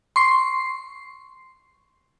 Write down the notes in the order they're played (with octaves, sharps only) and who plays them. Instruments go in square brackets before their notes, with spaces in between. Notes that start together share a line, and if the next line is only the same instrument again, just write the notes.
[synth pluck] C6 C#6 C7